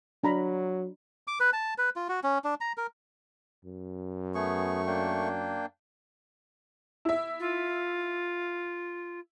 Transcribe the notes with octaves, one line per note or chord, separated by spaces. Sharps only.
F#3 D4 A#5 B5
D6
B4
A5
B4
F4
F#4
C#4
D4
A#5
A#4
F#2
A3 B3 G#4 C#6
A#3 D4 G5
E4 E5
F4